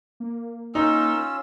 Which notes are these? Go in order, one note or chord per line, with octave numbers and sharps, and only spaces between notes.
A#3
C#4 D#4 F4 E6